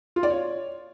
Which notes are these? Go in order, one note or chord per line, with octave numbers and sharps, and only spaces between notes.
F4
D5
C#5